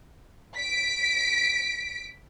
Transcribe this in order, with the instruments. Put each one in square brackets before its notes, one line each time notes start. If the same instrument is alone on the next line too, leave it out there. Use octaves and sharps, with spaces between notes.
[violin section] B6 D7